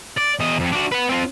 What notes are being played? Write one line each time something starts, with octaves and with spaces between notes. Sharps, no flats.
D5
E2 D#5
F2
D4 F#4
B4 F#5
C4 F4